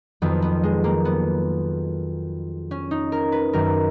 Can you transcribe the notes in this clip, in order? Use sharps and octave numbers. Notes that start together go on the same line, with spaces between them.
F2 D#3 F#3 B3
B3
G#3
A#3
B3
C#4
D#4
A#4
B4
F#2 D#3 F#3 A#4